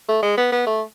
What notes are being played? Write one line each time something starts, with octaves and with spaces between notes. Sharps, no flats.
A3
G#3
B3
B3
A3